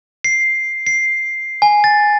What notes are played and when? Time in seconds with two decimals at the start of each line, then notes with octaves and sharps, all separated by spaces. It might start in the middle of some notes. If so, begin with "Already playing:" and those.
0.24 C7
0.87 C7
1.62 G#5
1.84 A6